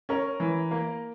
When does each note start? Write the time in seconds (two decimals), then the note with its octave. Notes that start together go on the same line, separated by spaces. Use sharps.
0.09 C#4 A#4
0.40 E3
0.71 A#3